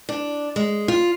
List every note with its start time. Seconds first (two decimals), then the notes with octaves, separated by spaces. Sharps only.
0.09 D4
0.56 G#3
0.88 F4